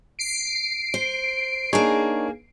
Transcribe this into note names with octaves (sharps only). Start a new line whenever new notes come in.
C7 D7
C5
A#3 D4 D#4 G#4 C#5